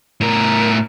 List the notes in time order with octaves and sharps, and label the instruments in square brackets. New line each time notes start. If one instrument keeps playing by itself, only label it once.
[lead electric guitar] A2 A#4